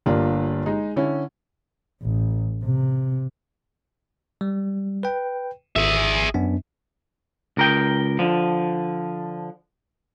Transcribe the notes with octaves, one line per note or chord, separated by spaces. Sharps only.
G1 A#3 D4 F4
G#3 D#4
D3 C#4 E4
A1
C3
G3
B4 G5
G#1 G#4 E5
F#2 B3 D4
C#2 A#4 G5
D3 F3